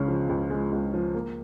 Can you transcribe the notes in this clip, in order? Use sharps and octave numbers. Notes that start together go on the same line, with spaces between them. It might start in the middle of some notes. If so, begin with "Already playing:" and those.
Already playing: C#2 C#3 G#3 C#4
F3
C#2
G#3
C#2
F3
A#3